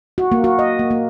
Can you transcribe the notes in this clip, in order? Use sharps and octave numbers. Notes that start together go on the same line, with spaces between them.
F#4
A#3
F#4
D#5
A#3
A#3